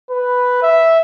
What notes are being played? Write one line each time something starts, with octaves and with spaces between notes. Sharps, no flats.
B4
E5